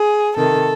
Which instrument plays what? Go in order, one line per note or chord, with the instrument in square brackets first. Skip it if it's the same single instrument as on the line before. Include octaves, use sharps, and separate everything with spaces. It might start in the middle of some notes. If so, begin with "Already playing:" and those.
Already playing: [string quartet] G#4
C3 D#3 A4